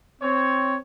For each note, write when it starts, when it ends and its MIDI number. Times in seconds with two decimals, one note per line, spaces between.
0.22 0.77 60
0.22 0.77 73